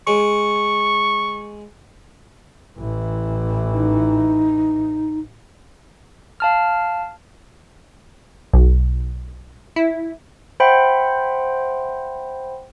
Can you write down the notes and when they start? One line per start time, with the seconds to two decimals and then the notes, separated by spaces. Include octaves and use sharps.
0.07 G#3 C#6
2.78 A1 E3
3.73 D#4
6.40 F5 A5 F6
8.53 B1
9.76 E4
10.60 C5 E5 F#5 G5 B5 C6